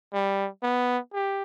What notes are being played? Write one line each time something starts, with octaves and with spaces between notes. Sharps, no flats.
G3
B3
G4